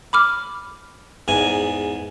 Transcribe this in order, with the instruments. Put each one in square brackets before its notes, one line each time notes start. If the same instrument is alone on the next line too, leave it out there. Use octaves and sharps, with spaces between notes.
[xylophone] B5 D6 F6
[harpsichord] E2 G#2 G#5